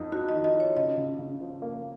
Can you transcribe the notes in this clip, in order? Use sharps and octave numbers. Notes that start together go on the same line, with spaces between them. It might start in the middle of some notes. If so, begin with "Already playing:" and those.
Already playing: F2 D#4
D#4 F#4
D#5
D#3
D#5
D#4 C#5
C#3 D#5
C#3
C#3
F3
A#3